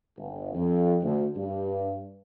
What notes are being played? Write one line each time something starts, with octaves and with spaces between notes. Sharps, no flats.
G1
F2
D2
G2